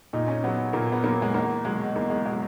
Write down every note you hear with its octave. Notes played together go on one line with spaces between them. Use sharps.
A#2 D#4
C#4
F#3 B3
A#2 A#3
B3
F#3 A#3
G#3
E2 A#3
B2 F#3 G#3
E2 A#3
G#3
B2 F#3 G#3